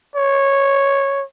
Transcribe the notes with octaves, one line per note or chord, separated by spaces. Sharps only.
C#5